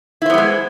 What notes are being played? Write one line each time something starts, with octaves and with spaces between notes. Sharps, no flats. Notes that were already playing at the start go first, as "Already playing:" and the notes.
G3 G#3 B3 E4 C5